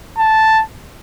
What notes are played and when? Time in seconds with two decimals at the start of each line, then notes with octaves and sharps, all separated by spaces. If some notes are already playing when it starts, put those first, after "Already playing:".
0.18 A5